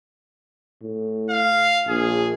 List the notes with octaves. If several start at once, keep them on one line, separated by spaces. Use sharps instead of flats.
A2
F5
A#1 G#4